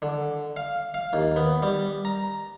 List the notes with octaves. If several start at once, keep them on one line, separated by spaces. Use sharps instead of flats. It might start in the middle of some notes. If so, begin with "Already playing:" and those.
D3
F5
F5
D#2
B3
G3
A#5